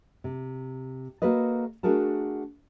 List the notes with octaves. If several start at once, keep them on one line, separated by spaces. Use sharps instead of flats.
C3
A#3 F#4 A4 B4 D#5
A3 D4 F#4 G#4 A#4 A5